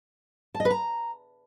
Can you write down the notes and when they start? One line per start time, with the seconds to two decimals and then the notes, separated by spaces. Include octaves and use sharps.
0.55 A5
0.60 D#5
0.65 B4
0.70 A#5